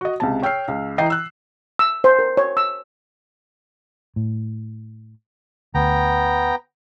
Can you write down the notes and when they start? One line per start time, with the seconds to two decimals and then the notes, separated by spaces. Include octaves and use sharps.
0.01 F#4 D#5
0.20 C#2 C3 A5
0.43 C#5 G5 E6 F6 C7
0.68 C#2
0.98 E3 D#5 G5 A#5 C7
1.10 E6 F#6
1.79 E6
2.04 C5
2.19 A#4
2.37 C#5
2.57 E6
4.16 A2
5.75 D2 B3 G5 A#5